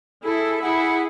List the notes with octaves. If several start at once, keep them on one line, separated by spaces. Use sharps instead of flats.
E4 G#4 A4
E4 G#4 F#5